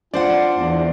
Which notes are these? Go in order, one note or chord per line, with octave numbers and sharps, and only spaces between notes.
D4 F4 C5 D5 F#5
E2